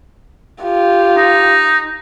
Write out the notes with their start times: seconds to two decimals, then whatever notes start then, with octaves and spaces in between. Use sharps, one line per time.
0.63 F4 G4
1.17 D#4